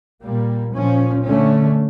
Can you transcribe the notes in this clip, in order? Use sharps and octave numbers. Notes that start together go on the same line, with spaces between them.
A#2 G3 A#3
A#2 F3 C#4
D3 A3 C#4